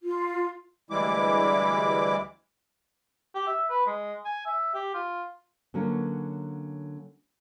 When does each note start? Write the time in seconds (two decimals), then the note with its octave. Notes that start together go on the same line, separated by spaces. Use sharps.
0.02 F4
0.90 D2 E3 G3 G#3 E4 D6
3.35 G4
3.47 E5
3.69 B4
3.86 G#3
4.25 G#5
4.46 E5
4.74 G4
4.94 F4
5.74 D3 F#3 A#3 C#4